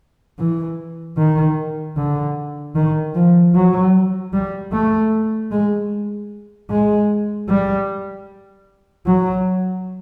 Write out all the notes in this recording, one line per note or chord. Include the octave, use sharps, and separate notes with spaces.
E3
D#3
D3
D#3
F3
F#3
G3
A3
G#3
G#3
G3
F#3